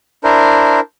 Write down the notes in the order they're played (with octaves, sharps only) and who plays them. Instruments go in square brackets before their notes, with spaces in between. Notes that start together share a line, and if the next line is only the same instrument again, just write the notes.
[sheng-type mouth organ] D4 E4 A#4 C5